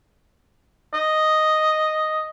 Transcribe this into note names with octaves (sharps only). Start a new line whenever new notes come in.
D#5